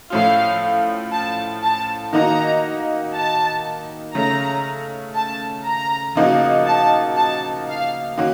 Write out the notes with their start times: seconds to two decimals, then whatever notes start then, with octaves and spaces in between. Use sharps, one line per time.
0.10 A2 F3 A3 C#4 F4 F5
1.11 A5
1.62 A5
2.13 D#3 A#3 D#4 F#4 A#5
3.13 A5
4.14 C#3 A3 C#4 A#5
5.15 A5
5.66 A#5
6.15 C#3 F3 A#3 D#4 F#4
6.66 A5
7.17 A5
7.68 F5
8.17 D#3 A#3 C#4 F#4